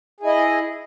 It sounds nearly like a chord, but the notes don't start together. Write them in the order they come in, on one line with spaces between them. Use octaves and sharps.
G#4 E4 D#5